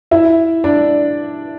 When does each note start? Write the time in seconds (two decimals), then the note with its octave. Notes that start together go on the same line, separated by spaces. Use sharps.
0.11 E4 E5
0.64 D4 D5